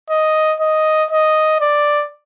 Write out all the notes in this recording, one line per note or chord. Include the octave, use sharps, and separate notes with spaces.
D#5
D#5
D#5
D5